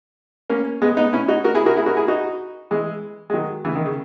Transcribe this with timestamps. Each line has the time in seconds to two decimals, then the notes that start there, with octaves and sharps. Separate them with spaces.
0.50 A#3 C#4
0.82 G#3 B3
0.97 B3 D#4
1.13 C#4 E4
1.28 D#4 F#4
1.44 F#4 A#4
1.55 E4 G#4
1.66 F#4 A#4
1.77 E4 G#4
1.86 F#4 A#4
1.97 E4 G#4
2.08 D#4 F#4
2.71 E3 G#3
3.30 G#3
3.34 D#3 F#3
3.65 C#3 E3
3.75 D#3
3.86 C#3